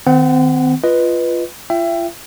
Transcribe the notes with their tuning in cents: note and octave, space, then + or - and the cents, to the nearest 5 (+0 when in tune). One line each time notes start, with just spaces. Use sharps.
D#3 +0 C4 -35 F#5 +0
F4 -10 B4 +0 D#5 -5
F4 -40 E5 +30 G5 +0